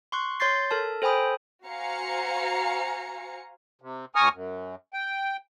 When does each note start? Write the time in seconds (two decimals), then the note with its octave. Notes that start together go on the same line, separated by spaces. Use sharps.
0.12 C6 C#6 F#6
0.40 C#5 C6 G6 A6 C7
0.71 A4 A#4 A5
1.02 A4 C5 G5 G#5 B5 D#6
1.67 F#4 C5 F5 G#5 A#5 C#7
3.82 C3
4.15 D2 G#5 A#5 C#6 D#6 F6
4.34 F#2
4.93 G5